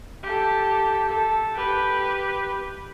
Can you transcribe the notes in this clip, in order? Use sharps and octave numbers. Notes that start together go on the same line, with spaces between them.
G4 A4
A4
G4 B4